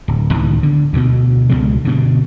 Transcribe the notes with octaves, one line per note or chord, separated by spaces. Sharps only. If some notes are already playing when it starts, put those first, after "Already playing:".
D1
C#2 A2 D#3 B3
D3
D2 B2
C#2 B2 G#3
G2 B2 D3